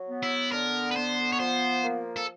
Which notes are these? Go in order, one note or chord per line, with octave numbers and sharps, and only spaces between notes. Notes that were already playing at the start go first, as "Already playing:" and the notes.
Already playing: F#3
B3
E4
D3 A#4
B4
B3 C5
C#5
F3 C5
A#3
A4